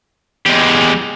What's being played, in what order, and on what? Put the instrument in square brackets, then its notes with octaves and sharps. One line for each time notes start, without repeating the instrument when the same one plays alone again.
[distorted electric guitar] E2 [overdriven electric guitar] G#3 G4